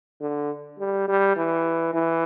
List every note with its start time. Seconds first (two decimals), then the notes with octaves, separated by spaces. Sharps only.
0.21 D3
0.79 G3
1.08 G3
1.36 E3
1.94 E3